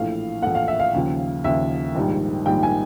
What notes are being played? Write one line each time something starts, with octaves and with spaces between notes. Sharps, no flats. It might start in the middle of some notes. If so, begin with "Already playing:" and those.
Already playing: A#1 A2 E3 A3 F5
A#1 A2 E3 A3 F#5
F5
E5
F5
D#2 C#3 F3
D#2 C#3 F3 E5
A#1 G#2 D#3 G3
A#1 G#2 D#3 G3 G5
G#5